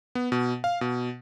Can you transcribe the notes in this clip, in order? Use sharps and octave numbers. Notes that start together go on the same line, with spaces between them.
B3
B2
F5
B2